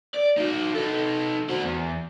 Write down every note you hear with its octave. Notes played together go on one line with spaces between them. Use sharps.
D5
D#4 F#4
D#4 A4
F#4 C5
E2